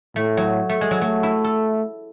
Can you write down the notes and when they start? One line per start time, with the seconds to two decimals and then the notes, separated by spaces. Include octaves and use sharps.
0.16 A2 A3
0.37 F#3
0.69 A3
0.81 G#3
0.91 F#3
1.01 F#3 A3
1.23 E4
1.44 A4